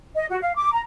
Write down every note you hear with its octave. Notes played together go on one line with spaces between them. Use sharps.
D#5
F#4
F5
D6
A#5